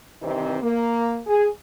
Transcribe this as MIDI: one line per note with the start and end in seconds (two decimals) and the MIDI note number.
0.22 0.57 43
0.22 0.57 48
0.22 0.57 51
0.22 0.57 52
0.22 0.57 60
0.22 0.57 63
0.62 1.20 58
1.27 1.48 68